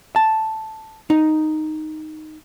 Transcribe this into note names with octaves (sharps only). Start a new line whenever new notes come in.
A5
D#4